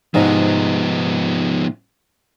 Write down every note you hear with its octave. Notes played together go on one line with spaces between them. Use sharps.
G#2 C3 F3 B3 D#4